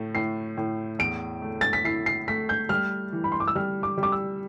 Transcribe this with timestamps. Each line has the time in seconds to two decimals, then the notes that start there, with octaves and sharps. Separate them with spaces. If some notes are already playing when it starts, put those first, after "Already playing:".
Already playing: A2 A3
0.15 A2 C7
0.57 A2
0.99 E2 D7
1.42 A3
1.61 A6
1.73 B6
1.84 E4 C7
2.06 C7
2.28 A3 B6
2.49 G6
2.69 G3 F6
3.13 E3
3.24 B5
3.32 C6
3.40 D6
3.47 E6
3.55 G3 F6
3.83 D6
3.98 G3
4.03 D6
4.12 E6